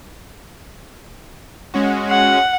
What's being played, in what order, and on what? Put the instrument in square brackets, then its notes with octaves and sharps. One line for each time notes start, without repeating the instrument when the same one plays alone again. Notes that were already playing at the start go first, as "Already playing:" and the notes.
[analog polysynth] G#3 C#4 F#4
[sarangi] F#5